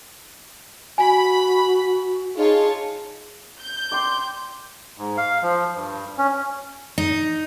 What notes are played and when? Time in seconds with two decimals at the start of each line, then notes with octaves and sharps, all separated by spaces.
0.98 F#4 G#5 B5
2.37 D#4 F4 G#4 C#5 A5
3.60 G6
3.92 D5 G5 C6
4.98 G#2
5.17 F5
5.43 F3
5.75 G2
6.18 C#4
6.98 D#4